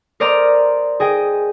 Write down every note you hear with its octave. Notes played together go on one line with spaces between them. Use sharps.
A#4 C5 D5 D#5 A#5 C6
G#4 D#5 G5